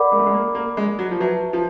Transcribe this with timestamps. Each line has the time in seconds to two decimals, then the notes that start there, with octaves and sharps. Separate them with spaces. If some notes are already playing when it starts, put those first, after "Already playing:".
Already playing: A#4 D5 F#5 B5 D6
0.12 G#3
0.19 A3
0.26 G#3
0.34 A#3
0.55 A#3
0.77 G#3
0.99 F#3
1.11 F3
1.20 F#3 B4 E5 A5
1.53 F3